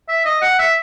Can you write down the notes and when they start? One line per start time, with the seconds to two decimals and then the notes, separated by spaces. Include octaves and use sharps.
0.08 E5
0.25 D#5
0.42 F#5
0.59 E5